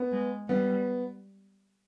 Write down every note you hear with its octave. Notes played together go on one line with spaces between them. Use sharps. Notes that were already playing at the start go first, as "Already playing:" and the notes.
Already playing: B3
G#3
G3 B3